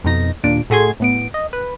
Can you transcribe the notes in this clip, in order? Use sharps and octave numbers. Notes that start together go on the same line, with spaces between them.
F2 B2 D#4 A#6
D#2 A#2 D4 D7
A2 A3 F#4 G#4 C6 G#6
A2 B3 D7
D#5
B4